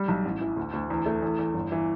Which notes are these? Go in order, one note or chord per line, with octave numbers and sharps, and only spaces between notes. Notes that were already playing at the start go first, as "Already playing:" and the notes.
Already playing: G3
B1
A1
E3
D2
D2
E2
A3
E2
E2
G1
E3